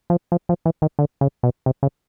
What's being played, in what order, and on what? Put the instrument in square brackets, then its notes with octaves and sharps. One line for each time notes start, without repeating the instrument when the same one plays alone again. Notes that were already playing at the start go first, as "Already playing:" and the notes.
[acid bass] F3
F3
F3
E3
D#3
D3
C#3
B2
C3
C#3